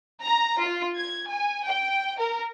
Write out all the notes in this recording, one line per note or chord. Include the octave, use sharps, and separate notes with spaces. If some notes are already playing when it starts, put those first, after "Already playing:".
A#5
F4
G#6
G#5
G5
A#4